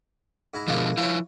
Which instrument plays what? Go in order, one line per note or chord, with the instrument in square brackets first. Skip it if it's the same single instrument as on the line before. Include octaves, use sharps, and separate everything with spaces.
[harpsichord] G#2 E4 A#5
[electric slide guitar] B2 D3 F3 [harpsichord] G#3 A#3 E4
[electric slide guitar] F3 E4 [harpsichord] F4 C#5